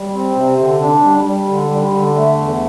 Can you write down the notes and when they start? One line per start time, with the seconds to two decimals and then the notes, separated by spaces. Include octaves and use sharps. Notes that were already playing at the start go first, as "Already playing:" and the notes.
Already playing: G3
0.14 C4
0.35 C3
0.59 D3
0.81 D4
1.04 G3
1.26 G3
1.48 D3
1.71 G3
1.94 D3
2.16 A3
2.39 E2